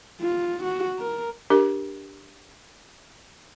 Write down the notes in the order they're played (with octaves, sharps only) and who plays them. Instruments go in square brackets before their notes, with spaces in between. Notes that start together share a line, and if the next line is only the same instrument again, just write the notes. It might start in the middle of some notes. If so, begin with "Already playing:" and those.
[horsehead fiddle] F4
F#4
A#4
[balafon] D4 G4 A#4